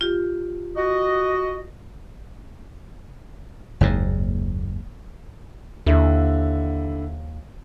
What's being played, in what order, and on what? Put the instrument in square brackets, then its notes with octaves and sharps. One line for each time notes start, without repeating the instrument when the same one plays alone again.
[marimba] F4 G4
[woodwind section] F#4 D#5
[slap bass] F#1 D#2 G#2
[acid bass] D#2 [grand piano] D3 E4